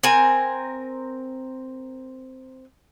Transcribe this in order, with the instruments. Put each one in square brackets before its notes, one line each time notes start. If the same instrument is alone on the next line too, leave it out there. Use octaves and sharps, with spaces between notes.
[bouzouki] C4 A#4 G#5